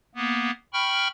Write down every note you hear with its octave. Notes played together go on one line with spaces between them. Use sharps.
A#3 B3
G5 B5 C#6 F6